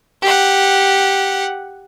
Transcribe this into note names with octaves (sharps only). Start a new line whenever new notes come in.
G4 F#5